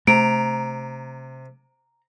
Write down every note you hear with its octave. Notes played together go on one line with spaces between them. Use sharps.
C3 A3 A#5 D7